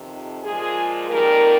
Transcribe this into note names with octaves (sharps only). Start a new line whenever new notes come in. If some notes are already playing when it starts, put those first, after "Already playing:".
Already playing: F2 C3 D#3
A#2 F3 G#3 G#4
F2 D#3 G3 A#3 A#4